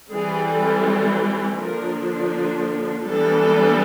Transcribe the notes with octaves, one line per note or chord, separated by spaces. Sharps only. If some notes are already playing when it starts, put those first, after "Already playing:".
E3 G3 C4 G#4
A4
D3 F3 A#3 D4 A#4
E3 G3 B3 D4 A4